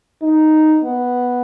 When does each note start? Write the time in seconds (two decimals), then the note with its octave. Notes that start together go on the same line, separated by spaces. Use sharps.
0.22 D#4
0.84 B3